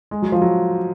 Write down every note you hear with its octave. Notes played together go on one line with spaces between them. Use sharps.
G#3
F#3
F3
F#3